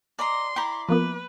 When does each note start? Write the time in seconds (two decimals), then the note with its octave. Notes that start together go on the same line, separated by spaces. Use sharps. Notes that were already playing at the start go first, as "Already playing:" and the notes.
0.19 D5 D#5 A#5 C6
0.56 E4 D5 G5 A#5 B5
0.89 F3 A#3 B3 B4